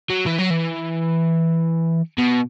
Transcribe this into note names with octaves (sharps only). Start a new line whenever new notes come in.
F#3
E3
F#3
E3
B2